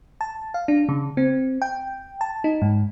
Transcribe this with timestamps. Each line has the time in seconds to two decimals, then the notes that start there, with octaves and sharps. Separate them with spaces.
0.21 A5
0.54 F5
0.68 D4
0.89 C#3
1.17 C4
1.62 G5
2.21 A5
2.44 D#4
2.62 G#2